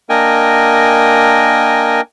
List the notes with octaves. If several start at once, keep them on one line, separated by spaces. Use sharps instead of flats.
A#3 D4 A#4 D#5 G5 G#5